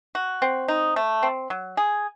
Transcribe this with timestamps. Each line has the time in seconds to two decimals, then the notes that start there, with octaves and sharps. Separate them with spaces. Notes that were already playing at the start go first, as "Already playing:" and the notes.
0.15 F#4
0.42 C4
0.68 D#4
0.96 A3
1.23 C4
1.50 F#3
1.77 G#4